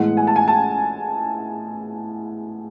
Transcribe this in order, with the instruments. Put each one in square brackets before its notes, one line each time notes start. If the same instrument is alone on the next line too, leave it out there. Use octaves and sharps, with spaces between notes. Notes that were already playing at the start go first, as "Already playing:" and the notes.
Already playing: [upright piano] A2 E3 G#3 B3 F#5
G#5
A5
G#5
A5